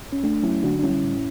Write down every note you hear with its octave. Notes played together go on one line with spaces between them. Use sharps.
C#4
A3 D4
F#3 C#4 E4
D3 D4 F#4
D4
G3 C#4 E4
A2